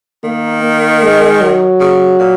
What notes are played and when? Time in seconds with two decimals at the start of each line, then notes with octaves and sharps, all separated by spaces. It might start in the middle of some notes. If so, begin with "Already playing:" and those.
0.24 D#3 A#3
0.63 A#3
1.03 G#3
1.41 F#3
1.80 C#3
2.19 A#2